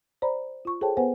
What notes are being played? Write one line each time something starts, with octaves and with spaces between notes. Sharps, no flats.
C5 D5 A#5 B5
F4 C#6
G#4 A4 C5 C#5 G5 A5
B3 B4 C5 F#5 G#5